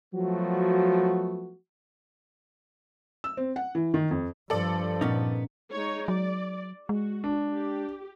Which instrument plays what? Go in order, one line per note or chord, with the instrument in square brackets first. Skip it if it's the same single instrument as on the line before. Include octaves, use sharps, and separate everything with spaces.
[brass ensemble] F3 F#3 A3 B3 F#4
[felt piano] E6
C4
F#5
E3
D#3
F2
[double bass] G2 F3 [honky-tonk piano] A4 D5
[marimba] A#2 [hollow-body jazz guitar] B3 C#4 D#4
[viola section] G#3 D#4 C#5
[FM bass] F#3 [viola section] D5
[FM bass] G#3 [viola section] F#4
[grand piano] D4
[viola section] G4